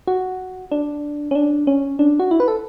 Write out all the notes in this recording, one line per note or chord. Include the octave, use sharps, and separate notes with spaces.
F#4
D4
C#4
D4
C#4
D4
F#4
E4
B4
A4